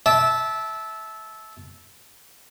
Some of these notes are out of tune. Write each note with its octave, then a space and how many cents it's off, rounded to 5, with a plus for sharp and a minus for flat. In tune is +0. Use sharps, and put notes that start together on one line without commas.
E5 -15 A5 -20 D6 +0